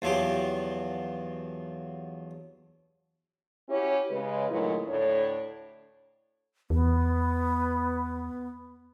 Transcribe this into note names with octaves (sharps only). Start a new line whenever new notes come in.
E2 F3 F#3 G4
C#4 E4 F#4 G4 C#5
C#3 G#3 B4
A#2 D#3 F#3 G#3 A3 E4
D2 A2 D4 C#5
E2 B3